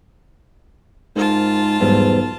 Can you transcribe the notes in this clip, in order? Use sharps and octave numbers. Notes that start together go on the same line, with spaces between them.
G#2 F4 A#4 C5 A5
B1 E2 G#2 G3